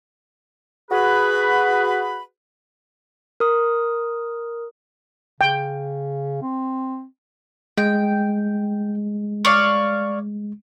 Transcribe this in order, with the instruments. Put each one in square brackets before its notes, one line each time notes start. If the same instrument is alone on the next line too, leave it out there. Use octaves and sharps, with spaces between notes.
[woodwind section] F#4 G#4 B4 B5
[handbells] A#4 D#6
[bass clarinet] C#3 [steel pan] G5
[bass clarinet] C4
[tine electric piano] G#3 [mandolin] G5
[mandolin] C#5 D5 F5